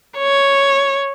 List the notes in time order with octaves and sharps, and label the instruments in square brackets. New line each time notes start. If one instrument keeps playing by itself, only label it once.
[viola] C#5